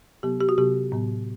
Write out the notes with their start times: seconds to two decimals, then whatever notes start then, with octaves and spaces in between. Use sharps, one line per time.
0.23 C3 F#3 B3 G4
0.41 G4
0.49 F#4
0.58 C3 F#3 B3 G4
0.92 A2 F#3 B3